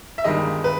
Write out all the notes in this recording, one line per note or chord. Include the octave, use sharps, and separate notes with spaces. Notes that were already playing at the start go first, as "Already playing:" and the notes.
E5
G1 G2 D#3 G#3 D#5
B4